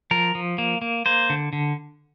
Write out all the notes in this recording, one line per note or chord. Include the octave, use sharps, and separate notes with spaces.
F3 A#4
F3
A#3
A#3
A#3 C5
D3
D3